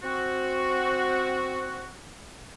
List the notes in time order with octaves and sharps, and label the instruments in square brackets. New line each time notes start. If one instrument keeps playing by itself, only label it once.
[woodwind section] C4 F#4